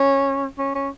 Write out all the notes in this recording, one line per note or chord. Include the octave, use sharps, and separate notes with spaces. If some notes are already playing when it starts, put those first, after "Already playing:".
Already playing: C#4
C#4
C#4